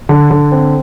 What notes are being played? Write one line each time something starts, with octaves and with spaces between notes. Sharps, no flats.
D3
D3
C4